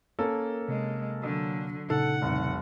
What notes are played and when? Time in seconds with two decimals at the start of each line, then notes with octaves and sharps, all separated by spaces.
0.19 A#3 C#4 A4 A#4
0.68 C3 G#3
1.19 D3 F#3
1.90 A#2 C#3 D#4 A4 F#5
2.22 F1 C2